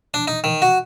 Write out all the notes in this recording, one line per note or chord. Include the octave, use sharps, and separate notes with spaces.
D4
D#4
D#3
F#4